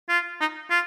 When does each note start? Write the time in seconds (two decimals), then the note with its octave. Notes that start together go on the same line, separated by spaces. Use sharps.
0.09 F4
0.41 D#4
0.70 F4